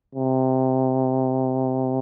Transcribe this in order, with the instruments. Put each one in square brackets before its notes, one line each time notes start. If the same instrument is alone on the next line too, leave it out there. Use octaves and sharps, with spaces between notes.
[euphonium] C3